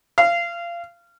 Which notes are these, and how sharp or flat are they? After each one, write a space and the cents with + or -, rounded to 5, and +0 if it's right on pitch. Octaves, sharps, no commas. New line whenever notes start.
F5 -25